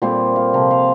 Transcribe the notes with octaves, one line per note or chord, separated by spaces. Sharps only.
A#2 G3 C4 C5
F5
C3 F3 A#3
F5